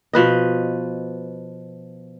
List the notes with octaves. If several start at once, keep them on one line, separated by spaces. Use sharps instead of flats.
B2 F3 B4 D#5